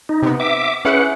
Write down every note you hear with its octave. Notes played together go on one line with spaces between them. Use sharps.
D#4
C3 B3
E5 D6
C#4 E4 G#4 B4 F#5